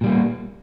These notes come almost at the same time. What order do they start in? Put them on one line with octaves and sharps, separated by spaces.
A#2 G3 A#3 B3